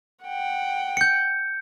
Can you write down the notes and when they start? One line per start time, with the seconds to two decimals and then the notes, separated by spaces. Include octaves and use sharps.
0.24 F#5 G5
0.97 G6 C#7